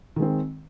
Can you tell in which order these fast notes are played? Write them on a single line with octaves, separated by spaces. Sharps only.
D#3 G#3 C4